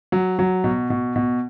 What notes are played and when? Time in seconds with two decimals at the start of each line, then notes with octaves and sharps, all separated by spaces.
0.12 F#3
0.39 F#3
0.64 B2
0.90 B2
1.16 B2